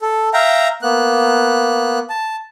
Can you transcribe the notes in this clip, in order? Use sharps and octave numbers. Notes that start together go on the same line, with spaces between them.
A4
E5 F5 G5 A#5
A#3 B3 F#6
A5